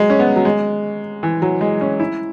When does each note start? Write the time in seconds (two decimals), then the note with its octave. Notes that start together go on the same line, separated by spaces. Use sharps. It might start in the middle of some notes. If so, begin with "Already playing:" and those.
Already playing: F#3 G#3
0.10 C#4
0.19 B3
0.36 F#3
0.45 G#3
1.23 E3
1.42 F#3
1.61 G#3
1.81 C#4
2.00 E4